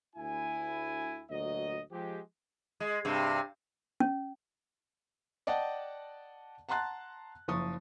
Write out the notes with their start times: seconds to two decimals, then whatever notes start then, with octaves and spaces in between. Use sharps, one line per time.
0.16 D2 E4 G#5
1.30 D2 A#2 F#3 D#5
1.91 F3 G#3 G4
2.80 G#3
3.05 G2 C3
4.00 C#4
5.47 D5 D#5 F#5 G5 A5
6.69 F#5 A5 A#5 C6 F#6 A6
7.48 F#1 F3 C#6 D#6